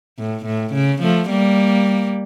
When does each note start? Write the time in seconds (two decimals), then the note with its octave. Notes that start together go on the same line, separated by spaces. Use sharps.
0.18 A2
0.45 A2
0.74 C#3
1.02 F3 A3
1.30 G3 A#3